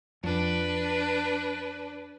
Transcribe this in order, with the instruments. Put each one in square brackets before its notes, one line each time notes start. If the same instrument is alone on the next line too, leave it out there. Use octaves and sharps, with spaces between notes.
[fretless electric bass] F2 [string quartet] D4 B4